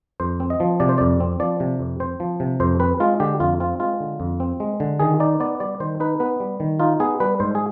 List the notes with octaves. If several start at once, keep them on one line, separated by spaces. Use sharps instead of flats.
F2 C5
C4
D#5
F3
C3 D5
C5
F2 D5
C4
F3 D5
C3
F2
C4 C5
F3
C3
F2 C5
C4 B4
G#3 F4
D3 G4
F2 F4
C4 F4
G#3 F4
D3
F2
C4
G#3
D3
D#3 G#4
D#4 D5
B3 D5
G3 D5
D#3 C5
D#4 B4
B3 B4
G3
D#3
D#4 F4
B3 G#4
G3 B4
G#2 C5
G#4